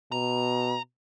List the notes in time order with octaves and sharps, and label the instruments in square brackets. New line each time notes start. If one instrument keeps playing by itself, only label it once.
[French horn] B2 [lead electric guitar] A#5